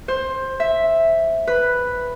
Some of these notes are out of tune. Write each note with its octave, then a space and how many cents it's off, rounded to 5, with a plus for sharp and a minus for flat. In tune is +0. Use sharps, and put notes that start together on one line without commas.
C5 +15
E5 +0
B4 +0